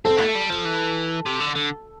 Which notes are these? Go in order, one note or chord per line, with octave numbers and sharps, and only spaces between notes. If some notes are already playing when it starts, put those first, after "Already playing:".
C4 A4
A3
G3
F3
E3
C3
D3
D3